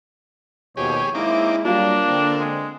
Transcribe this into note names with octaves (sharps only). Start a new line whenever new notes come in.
D#2 B2 F3 G4 G#4 C#5
G#3 A#3 C4 D#4 E4 D6
F#3 G3 A#3 D4 F4 F5
D3 C4
G#3